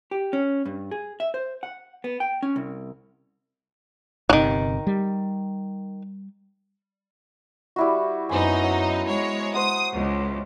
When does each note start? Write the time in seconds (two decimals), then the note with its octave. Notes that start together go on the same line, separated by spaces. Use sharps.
0.11 G4
0.33 C#4
0.66 G2
0.91 G#4
1.20 E5
1.34 C5
1.63 F#5
2.04 B3
2.20 G5
2.43 C#4
2.56 C2
4.30 G1 C3 D#3 F#3
4.87 G3
7.76 G3 E4 F#4
8.29 F#2 B3 C4 D#4 G#5
8.63 F#3
9.08 G#3 C#5
9.54 C5 F#5 D#6
9.93 C#2